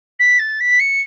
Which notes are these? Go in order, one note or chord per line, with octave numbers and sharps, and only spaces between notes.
B6
A6
B6
C#7